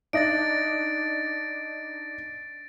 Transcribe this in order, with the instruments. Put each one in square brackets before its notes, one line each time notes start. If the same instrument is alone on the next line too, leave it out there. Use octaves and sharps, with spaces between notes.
[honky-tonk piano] D4 D#4 [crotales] A6 A#6 D7